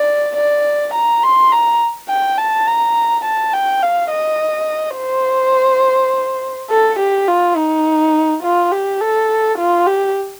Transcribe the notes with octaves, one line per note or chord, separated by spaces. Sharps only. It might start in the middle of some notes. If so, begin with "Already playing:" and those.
Already playing: D5
D5
A#5
C6
A#5
G5
A5
A#5
A5
G5
F5
D#5
C5
A4
G4
F4
D#4
F4
G4
A4
F4
G4